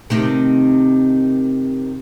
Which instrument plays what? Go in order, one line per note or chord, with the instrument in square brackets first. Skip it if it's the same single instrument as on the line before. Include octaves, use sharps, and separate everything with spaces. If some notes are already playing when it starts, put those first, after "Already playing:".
[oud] C3 D#3 A3